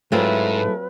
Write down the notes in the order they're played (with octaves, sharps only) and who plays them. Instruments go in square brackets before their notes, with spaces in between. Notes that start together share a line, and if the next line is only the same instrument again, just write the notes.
[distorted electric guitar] G#2 [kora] F#3 C4 F4 [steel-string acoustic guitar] A3 E4 G#4 [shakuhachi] B4